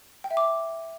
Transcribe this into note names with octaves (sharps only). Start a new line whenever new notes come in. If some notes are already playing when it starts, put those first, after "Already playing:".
G5
E5
D6